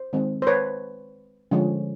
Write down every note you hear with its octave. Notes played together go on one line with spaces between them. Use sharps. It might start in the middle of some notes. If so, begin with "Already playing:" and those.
Already playing: C5
D#3 G#3 C4
C5
B4 C#5
D3 F3 G#3 C#4